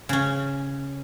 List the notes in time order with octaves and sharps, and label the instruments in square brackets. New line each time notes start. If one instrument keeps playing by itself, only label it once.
[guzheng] C#3 C#4